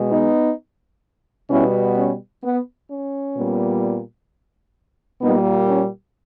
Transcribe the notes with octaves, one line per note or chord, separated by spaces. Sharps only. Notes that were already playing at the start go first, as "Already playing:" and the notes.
Already playing: B2 G#3
B3 D#4
B2 G3 B3 C#4 E4
C#4
B3
C#4
A#2 G3 B3
A#2 G3 A#3 B3 D#4
C#4